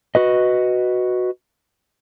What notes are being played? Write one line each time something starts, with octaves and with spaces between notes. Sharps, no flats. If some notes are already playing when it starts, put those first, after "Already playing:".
F#4 B4 D#5